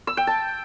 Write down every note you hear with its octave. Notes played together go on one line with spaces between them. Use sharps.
E6
G5
A5